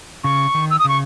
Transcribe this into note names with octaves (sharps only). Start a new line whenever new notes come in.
C#3 C#6
D#3
E6
D#6
C#3 C#6